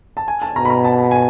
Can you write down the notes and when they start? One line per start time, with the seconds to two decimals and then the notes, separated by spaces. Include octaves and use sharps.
0.17 A5
0.28 G#5
0.42 A5
0.56 B2 A#5
0.65 B5
0.70 A#5
0.84 A5
1.11 G#5